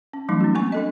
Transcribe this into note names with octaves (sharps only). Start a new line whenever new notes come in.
C#4
E3 F#3 G3 A3 C#4 D#4
C4 F#4
A#3 C4 G#5 C#6
D4 A4 D#5